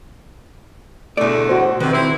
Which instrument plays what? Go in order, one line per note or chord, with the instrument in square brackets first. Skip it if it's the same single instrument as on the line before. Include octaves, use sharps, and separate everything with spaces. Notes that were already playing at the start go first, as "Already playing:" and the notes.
[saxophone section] E2 D3 A3 [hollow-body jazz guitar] B2 D5
[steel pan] F#4 C5
[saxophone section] C3 B4 [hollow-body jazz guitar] D#3
[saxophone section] C4 E4